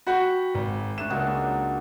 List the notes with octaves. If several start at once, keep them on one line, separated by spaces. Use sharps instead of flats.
F#4 F#5 G5 B5
G#1
A3 D4 C#5 E7
C#2 A#2 F#3 G#3
D4